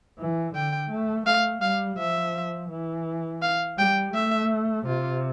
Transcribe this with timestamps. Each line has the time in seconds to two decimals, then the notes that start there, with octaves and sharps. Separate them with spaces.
0.19 E3
0.54 D3 G5
0.90 A3
1.26 A3 F5
1.62 G3 F5
1.98 F3 E5
2.70 E3
3.42 F5
3.78 G3 G5
4.14 A3 E5
4.86 C3 F4